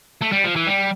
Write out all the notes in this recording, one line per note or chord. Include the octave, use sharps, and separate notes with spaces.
A3
G3
F3
E3
G3